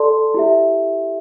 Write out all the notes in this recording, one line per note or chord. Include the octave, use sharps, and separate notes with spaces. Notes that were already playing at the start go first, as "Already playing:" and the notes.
Already playing: A4 D5 A5 C6
E4 G4 E5